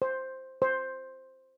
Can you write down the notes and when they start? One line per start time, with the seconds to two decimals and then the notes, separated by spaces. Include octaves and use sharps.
0.02 C5
0.62 C5